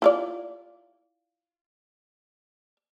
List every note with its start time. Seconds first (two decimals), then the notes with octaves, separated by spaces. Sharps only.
0.02 E4 F4 D5